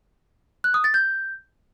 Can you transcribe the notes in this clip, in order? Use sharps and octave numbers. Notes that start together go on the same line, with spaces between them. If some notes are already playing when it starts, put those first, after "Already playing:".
F#6
D#6
A6
G6